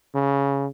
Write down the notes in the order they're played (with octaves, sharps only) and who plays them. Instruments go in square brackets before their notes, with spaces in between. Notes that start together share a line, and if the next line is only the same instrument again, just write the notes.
[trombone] C#3